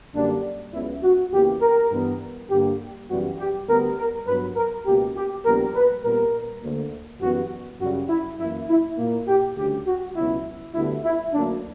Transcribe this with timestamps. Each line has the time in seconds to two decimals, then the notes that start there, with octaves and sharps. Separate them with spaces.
0.15 F#2 D3 G3 A#3 D4
0.73 C#2 C#3 F#3 B3 E4
1.03 F#4
1.32 E2 C#3 E3 A#3 G4
1.62 A#4
1.92 G2 E3 G3 B3
2.50 G2 D3 G3 A#3 G4
3.09 F#2 C#3 E3 G3 B3 F#4
3.39 G4
3.68 D2 D3 G3 B3 A#4
3.97 A#4
4.27 G2 F#3 B3 B4
4.56 A#4
4.86 C#2 B2 A#3 G4
5.16 G4
5.45 A#1 A#2 G3 B3 A#4
5.75 B4
6.04 A#2 G3 B3 A#4
6.62 D2 D3 A#3
7.21 F#2 E3 G3 B3 F#4
7.80 F#2 C#3 G3 F#4
8.09 E4
8.39 F#2 E3 A#3 E4
8.69 E4
8.98 A#2 A#3
9.28 G4
9.57 D2 C#3 G3 G4
9.87 F#4
10.16 C#2 B2 F#3 B3 E4
10.75 D2 D3 G3 B3 E4
11.04 E4
11.33 D2 D3 F#3 A#3 D4